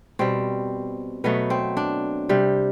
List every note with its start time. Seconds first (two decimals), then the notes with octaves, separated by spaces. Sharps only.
0.19 B2 G3 C4
1.24 B2 F#3 A3 B3
1.50 C4
1.77 D4
2.29 C3 G3